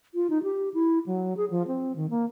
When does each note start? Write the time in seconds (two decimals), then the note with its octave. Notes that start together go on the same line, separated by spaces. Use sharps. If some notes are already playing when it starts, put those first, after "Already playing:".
0.15 F4
0.30 D#4
0.43 G4
0.74 E4
1.06 F#3
1.37 G#4
1.50 F3
1.67 C4
1.96 D#3
2.10 A#3